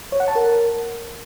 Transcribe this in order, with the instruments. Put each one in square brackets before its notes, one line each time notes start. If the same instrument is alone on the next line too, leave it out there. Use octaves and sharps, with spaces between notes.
[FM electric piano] C#5
F#5
A5
A#4